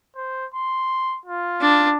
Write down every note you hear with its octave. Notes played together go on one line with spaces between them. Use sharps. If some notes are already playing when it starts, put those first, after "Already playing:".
C5
C6
F4
D4